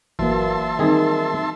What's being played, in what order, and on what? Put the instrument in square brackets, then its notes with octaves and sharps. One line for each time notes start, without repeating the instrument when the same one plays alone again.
[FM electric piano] G1 [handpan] E3 F#3 A#3 [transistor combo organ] E5 A5 C6
[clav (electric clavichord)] D#3 G#4 [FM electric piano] G3 C4 D#4